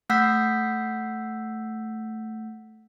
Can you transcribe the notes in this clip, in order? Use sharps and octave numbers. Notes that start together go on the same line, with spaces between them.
A3 F#5 E6 G6 B6